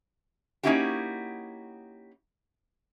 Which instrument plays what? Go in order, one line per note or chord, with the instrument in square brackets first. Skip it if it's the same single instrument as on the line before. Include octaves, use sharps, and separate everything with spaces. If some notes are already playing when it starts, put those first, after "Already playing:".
[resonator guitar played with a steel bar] A#3 C#4 D#4 E4 F#4 G4